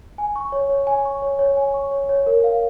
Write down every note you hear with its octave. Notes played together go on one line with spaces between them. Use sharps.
G#5
C#6
C#5
C#5
G#5
C#6
C#5
C#5
G#5
C#6
C#5
C#5
A#4
F5